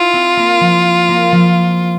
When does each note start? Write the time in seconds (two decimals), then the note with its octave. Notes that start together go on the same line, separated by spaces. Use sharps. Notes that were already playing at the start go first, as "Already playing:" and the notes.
Already playing: E4 F4
0.13 C4
0.37 A#3
0.61 F3
1.08 A#3
1.32 F3